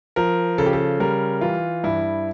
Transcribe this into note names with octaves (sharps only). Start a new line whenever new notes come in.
F3 A#4
C#3 A4
G4
A4
G3 A#4
E3 F4
G2 E4